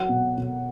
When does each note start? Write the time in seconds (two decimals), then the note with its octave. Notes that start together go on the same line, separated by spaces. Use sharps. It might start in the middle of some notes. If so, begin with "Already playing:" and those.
Already playing: F#3 F#5
0.09 B2
0.38 B2